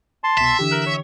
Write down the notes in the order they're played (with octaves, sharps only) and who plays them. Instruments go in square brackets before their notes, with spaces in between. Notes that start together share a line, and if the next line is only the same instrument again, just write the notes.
[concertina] A5 C6
[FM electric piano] C2 B2 [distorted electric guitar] E5
[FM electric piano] D3 E3 G4
[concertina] A#4 F#6
C#5